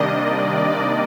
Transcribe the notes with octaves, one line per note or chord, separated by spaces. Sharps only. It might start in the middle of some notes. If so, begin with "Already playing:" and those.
Already playing: C3 D#3 G3 A#3 D4 D5 D#5